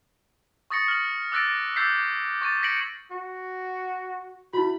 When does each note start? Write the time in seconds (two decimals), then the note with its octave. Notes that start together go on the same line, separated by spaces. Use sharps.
0.70 C#6 D#6 A6 A#6 C#7
0.88 F6 F#7
1.32 D6 E6 F#6 A6 A#6 D7
1.76 D6 E6 G6 A6 B6 C7
2.41 C#6 A6 D#7
2.62 G#6 A#6 B6 C#7 D7 F#7
3.11 F#4
4.53 E4 F#4 B5